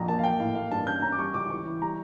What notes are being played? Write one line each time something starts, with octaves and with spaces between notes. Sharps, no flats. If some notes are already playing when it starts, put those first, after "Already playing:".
Already playing: A#1 F2 A#5
A#3 A5
F5
A#3 G5
A2 F5
A#3 F5
G2 A5
C#4 G6
C#4 A#5
D6
G3 C#6
C#2 D6
E3 C#6
E4
G3 A#5